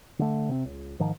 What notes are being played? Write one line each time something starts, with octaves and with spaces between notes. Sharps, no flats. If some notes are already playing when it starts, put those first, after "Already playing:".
D3 A3
C3 C4
C#2
G#2 D#3 F3